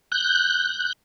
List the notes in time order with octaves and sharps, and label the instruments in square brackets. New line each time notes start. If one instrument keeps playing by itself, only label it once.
[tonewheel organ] F#6 G6